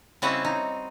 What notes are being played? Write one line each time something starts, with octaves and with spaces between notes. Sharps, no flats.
C#3 G3 C4 E4 F#4 D#5
D#4